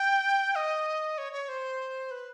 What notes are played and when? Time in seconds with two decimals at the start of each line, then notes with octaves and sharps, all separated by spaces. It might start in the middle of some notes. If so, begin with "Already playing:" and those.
Already playing: G5
0.55 D#5
1.18 C#5
1.33 C#5
1.49 C5
2.11 B4